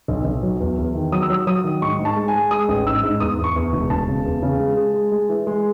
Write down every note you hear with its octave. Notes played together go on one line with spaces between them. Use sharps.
B1
B1
F#3
E2
E2
D#3
F#3 D#6
E6
F#3 D#6
F#3 D#6
D#3
G#2 C#6
G#2
A5
G#3
G#5
G#3
G#3 D#6
A1
G#2 E6
G#2
E2 D#6
E2
C#6
E2
E1
E1 A5
C#3
E2
C#3
G#3
G#3
G#3
G#3
E3
G#3